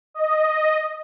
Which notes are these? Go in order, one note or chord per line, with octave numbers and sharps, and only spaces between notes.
D#5